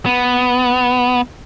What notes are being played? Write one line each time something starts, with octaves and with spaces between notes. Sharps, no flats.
B3